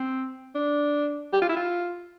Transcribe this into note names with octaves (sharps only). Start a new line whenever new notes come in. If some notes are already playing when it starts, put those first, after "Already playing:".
Already playing: C4
D4
G4
F4
E4
F4